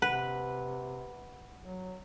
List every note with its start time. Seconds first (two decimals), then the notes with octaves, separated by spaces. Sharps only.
0.02 C3 B4 F#5
1.61 F#3